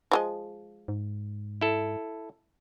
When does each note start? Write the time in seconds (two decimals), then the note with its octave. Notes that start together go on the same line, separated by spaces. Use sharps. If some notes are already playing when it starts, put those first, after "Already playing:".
0.11 F3 G#3 D#5
0.88 G#2
1.61 E4 A4